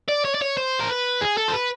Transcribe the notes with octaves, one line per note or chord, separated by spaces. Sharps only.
D5
C#5
D5
C#5
C5
A#4
B4
G#4
A4
C5
B4